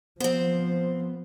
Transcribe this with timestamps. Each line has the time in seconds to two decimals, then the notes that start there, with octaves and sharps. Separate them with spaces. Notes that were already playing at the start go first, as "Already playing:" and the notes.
0.20 F3 B3 C4 C5